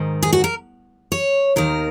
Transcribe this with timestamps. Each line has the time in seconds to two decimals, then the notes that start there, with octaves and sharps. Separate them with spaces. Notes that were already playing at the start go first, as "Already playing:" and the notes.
Already playing: G#2 D#3
0.23 G#4
0.33 F#4
0.44 A#4
1.12 C#5
1.56 D#2 D#3 A#4